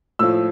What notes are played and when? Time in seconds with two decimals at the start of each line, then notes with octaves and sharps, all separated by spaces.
0.19 A2 F3 E6